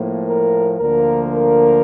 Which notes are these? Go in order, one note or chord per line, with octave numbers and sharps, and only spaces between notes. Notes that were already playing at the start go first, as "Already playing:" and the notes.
Already playing: A2 F3 A#3
A#4
D2 D3 F3 A#3 A#4
A#4